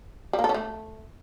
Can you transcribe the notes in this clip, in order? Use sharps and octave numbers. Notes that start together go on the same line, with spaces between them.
G3
A#3
A4
C#4
A3